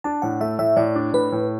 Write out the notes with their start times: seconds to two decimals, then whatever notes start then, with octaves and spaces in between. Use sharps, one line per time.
0.04 D4 A5
0.22 A2 F#5
0.41 A3 E5
0.59 A2 E5
0.76 A2 D5
0.95 D4
1.13 A2 B4
1.32 A2